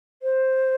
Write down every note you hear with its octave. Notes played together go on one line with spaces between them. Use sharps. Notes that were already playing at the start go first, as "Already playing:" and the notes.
C5